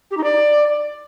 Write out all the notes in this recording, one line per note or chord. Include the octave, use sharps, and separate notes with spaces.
G4
D#4
D5